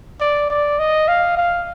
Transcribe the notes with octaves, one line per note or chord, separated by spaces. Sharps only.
D5
D5
D#5
F5
F5